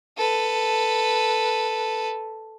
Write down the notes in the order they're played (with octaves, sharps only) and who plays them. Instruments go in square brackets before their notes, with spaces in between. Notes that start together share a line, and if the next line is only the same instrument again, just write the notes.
[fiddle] A4 B4